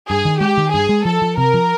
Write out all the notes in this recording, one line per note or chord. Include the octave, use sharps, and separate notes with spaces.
G2 G#4
D#3
G#3 G4
D#3
G2 G#4
G#3
F3 A4
F3
C3 A#4
F3